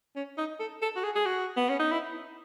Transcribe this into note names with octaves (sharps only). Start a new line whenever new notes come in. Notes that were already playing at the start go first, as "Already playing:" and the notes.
C#4
D#4
A4
A4
F#4
G#4
G#4
F#4
B3
C#4
D#4
E4